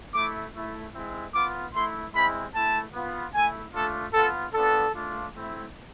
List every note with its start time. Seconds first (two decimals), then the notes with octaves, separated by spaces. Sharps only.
0.14 A3 E4 D6
0.53 A3 E4
0.94 G#3 C4 E4
1.33 B3 F4 D6
1.74 A3 E4 C6
2.14 G#3 C4 E4 B5
2.53 A3 E4 A5
2.93 B3 F4
3.33 A3 E4 G#5
3.73 A3 D4 F4 A4
4.14 B3 F4 A4
4.53 B3 D4 F4 A4
4.94 A3 D4 F4
5.33 A3 C4 E4